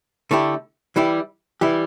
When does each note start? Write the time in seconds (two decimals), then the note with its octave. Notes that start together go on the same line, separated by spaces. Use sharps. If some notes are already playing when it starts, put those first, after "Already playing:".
0.31 D3 A3 E4 G4
0.96 E3 G3 E4 G4
1.61 E3 G3 E4 G4